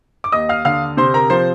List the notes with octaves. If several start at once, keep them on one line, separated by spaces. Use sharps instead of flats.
D6
D#2 D#5 D#6
F5 F6
D3 F5 F6
C3 C5 C6
A#4 A#5
F3 C5 C6